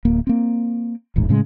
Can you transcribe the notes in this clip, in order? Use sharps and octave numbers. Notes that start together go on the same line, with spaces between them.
D1 A#3
A#3 C4
D#1 A1 G#2
A2 C#3 G3 G#3